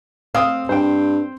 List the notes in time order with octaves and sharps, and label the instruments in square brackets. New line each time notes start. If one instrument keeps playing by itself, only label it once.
[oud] C4 [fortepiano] F5 D#6
[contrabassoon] G2 [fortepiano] C5 G5